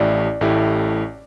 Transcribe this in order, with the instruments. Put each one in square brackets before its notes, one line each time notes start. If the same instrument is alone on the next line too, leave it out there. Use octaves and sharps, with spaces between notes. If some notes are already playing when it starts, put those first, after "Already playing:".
Already playing: [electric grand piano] A1 A2 A3 E4 G4 [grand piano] D5
[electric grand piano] A1 A2 A3 E4 G4